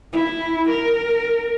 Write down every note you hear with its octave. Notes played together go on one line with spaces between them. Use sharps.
E4
A#4